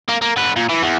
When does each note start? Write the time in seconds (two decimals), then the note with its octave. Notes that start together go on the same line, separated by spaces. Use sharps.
0.09 A#3
0.22 A#3
0.37 D3 B4
0.56 A#2
0.69 E3
0.83 E2